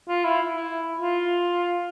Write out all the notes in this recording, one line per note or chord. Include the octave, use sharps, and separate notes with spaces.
F4
E4
E4
F4